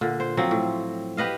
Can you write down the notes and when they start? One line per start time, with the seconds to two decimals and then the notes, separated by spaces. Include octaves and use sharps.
0.01 A#2 D3
0.20 C5
0.37 F3 F#3 C4
0.51 A2
1.17 G4 B4 D#5 F5